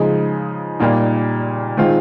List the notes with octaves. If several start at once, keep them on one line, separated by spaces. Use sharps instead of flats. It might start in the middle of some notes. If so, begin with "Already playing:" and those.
Already playing: C#3 F3 G#3 D#4
A#2 G3 A#3 D#4
D#3 G#3 C4 F4